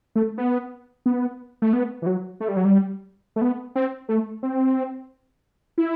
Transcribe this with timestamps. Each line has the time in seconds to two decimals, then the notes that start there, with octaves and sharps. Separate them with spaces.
0.16 A3
0.38 B3
1.06 B3
1.62 A3
1.73 B3
2.02 E3
2.06 F#3
2.40 A3
2.48 G3
2.57 F#3
2.65 G3
3.36 A3
3.41 B3
3.76 C4
4.09 A3
4.43 C4
5.78 E4